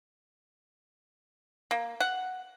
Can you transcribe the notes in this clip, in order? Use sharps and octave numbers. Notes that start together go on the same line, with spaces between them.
A#3
F#5